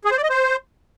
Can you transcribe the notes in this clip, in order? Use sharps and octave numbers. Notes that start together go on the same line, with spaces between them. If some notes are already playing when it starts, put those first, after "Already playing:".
G#4
C5
D5
D#5
C5